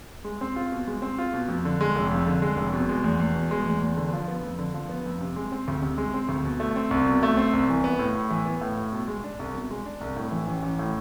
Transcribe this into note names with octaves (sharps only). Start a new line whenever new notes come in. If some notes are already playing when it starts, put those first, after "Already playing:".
G#3
C4
F4
B2
G#3
C4
F4
B2
F2
D3
G#3
F1
F2
D3
G#3
F1
B2
G#3
E2
E2
B2
G#3
E2
E2
D3
F3
B3
F2
D3
F3
B3
F2
C3
G#3
C4
D2
C3
G#3
C4
D2
B2
A3
C4
C2
B2
A3
C4
C2
E3
B3
A2
A2
E3
B3
A2
A2
B2
G#3
D4
C2
B2
G#3
D4
C2
A2
E3
A1
A1
A2